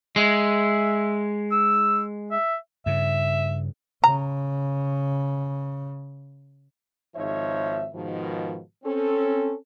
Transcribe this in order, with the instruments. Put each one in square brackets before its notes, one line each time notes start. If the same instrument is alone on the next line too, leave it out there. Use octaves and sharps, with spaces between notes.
[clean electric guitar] G#3 [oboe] E5
[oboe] E6
E5
[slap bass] G2 C#3 [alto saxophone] E5
[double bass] C#3 [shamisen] A#5
[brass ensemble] G#1 G#2 F3 D#4 C#5 E5
G#2 B2 D#3 F3
C4 C#4 A4